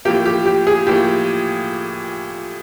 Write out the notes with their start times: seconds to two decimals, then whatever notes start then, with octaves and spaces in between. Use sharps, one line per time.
0.05 A2 F3 A#3 G4
0.26 G4
0.46 G4
0.67 G#4
0.87 A2 F3 A#3 G4